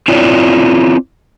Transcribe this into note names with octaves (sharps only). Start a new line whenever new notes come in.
C4 E4 F4 C#5 D5